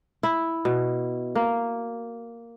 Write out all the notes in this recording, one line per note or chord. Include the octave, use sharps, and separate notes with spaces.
E4
B2
A#3